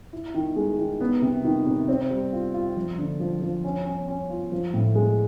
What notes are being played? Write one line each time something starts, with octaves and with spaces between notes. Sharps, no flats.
E4
D#3
G#3
D#3
B3
C3
D#3
C3
C4
G3
F4
F4
F3
D3
F3
F3
C#4
C#4
C#4
F4
F3
A2
G#3